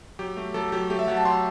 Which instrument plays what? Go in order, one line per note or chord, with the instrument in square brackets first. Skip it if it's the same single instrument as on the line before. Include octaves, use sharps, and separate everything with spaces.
[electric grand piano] F#3 G4
A3
F#3 A4
F#3 G4
A3 G4
E5
F#3 F#5
A5
F#3 C6